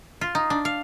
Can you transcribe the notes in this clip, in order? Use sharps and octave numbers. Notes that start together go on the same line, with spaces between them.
F4
D#4
D4
F5